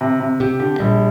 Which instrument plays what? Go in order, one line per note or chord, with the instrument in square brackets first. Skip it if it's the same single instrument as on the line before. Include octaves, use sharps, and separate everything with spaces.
[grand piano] C3
C3
[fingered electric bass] C3 [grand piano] G4
[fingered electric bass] D3 [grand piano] G4
[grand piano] A#1 [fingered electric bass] G3